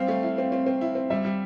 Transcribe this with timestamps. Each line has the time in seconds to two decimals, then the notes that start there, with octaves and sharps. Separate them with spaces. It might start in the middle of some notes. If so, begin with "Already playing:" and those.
Already playing: G3 C4 F5
0.08 A3
0.23 E4
0.38 C4
0.52 C4
0.66 C4
0.81 E4
0.95 C4
1.10 G3 E5
1.25 G3